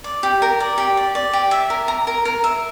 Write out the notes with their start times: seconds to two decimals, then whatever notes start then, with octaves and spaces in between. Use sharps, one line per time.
0.04 D5
0.23 G4
0.42 A#4
0.60 D5
0.78 G4
0.97 D5
1.15 D5
1.33 G4
1.51 E5
1.70 A#4
1.88 A#5
2.07 A#4
2.25 A#4
2.44 E5